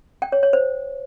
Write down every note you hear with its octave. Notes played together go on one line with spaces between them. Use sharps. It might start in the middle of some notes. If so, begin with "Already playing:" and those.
G5
C#5
C#5
C5